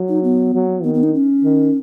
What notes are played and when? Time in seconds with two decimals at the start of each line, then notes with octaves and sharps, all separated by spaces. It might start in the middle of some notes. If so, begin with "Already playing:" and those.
Already playing: F#3
0.09 D#4
0.24 B3
0.54 F#3
0.83 D#3 B3
0.94 B3
1.03 D#4
1.15 C#4
1.44 D#3